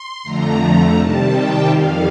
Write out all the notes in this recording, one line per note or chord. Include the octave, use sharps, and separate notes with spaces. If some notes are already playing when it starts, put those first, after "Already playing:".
Already playing: C6
F2 D3 F3 A3 A#5
C3 D#3 G3 A5
G5
F2 D#3 G3 F5